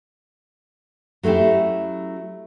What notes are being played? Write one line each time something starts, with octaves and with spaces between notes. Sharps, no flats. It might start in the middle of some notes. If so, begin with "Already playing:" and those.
F#3 A3 C#4 E4 G4